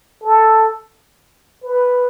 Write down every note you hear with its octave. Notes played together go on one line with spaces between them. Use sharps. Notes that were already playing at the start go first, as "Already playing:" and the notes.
A4
B4